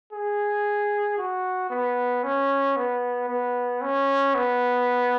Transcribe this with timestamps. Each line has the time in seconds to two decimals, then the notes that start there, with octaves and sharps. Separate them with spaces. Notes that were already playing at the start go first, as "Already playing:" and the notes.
0.13 G#4
1.18 F#4
1.70 B3
2.23 C#4
2.76 B3
3.29 B3
3.82 C#4
4.35 B3